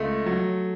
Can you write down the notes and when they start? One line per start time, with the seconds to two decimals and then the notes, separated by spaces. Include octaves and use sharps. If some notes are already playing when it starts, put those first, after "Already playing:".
Already playing: C#2 A3
0.26 F#3